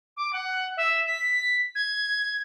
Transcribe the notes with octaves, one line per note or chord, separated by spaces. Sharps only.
D6
F#5
E5
B6
G#6